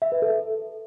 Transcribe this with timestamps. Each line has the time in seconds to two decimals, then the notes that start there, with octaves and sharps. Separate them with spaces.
0.02 E5
0.12 B4
0.22 A4